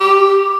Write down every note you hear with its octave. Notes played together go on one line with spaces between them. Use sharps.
G4